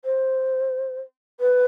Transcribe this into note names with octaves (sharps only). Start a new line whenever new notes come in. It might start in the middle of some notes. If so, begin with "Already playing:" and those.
C5
B4